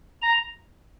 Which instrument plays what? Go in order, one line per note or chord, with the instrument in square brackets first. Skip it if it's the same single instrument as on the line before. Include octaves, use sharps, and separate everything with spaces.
[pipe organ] A#5